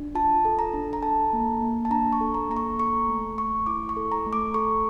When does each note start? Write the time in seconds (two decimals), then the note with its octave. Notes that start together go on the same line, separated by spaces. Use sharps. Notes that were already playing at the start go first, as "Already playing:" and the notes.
Already playing: D4
0.15 F4 A5
0.45 A4
0.59 A#5
0.73 D4
0.93 A#5
1.02 A4 A5
1.33 A#3
1.62 A#3
1.85 A5
1.90 D4 A#5
2.13 C#6
2.21 A4
2.34 A#5
2.49 A#3 A#5
2.56 C#6
2.79 A4 C#6
3.08 A3
3.37 A3 C#6
3.66 E4 D6
3.89 C#6
3.97 A4
4.12 A#5
4.26 A3
4.33 D6
4.54 A4 C#6